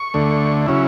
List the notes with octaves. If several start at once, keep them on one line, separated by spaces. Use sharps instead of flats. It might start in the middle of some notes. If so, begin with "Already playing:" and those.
Already playing: C#6
D2 D3 A3
C#3 F#3 C#4 E4